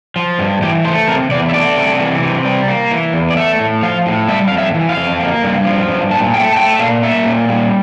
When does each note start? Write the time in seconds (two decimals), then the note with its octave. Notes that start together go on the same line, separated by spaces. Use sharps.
0.16 F3
0.39 G2
0.62 E3 G4
0.84 A3 C5
1.08 C3 A#4
1.31 E2 D5
1.49 E5
1.54 A3 D5
1.76 C3
1.99 E3
2.22 C3
2.45 G3
2.68 A#3
2.91 E3
3.13 E2
3.30 D5
3.36 A3 E5
3.59 A2
3.82 F3 F5
4.06 A2
4.28 G3 E5
4.48 F2 F5
4.58 E5
4.75 E3
4.89 F5
4.97 F2
5.19 A#3
5.43 G2
5.65 F3
5.88 G2
6.11 A#2 A5
6.34 A3 G5
6.53 A5
6.56 A3 G5
6.74 E5
6.79 A#2 F5
7.03 A#3 E5
7.25 A#2
7.48 G3